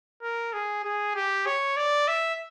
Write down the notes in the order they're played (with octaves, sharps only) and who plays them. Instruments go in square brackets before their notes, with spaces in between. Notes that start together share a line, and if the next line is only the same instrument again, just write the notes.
[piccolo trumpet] A#4
G#4
G#4
G4
C#5
D5
E5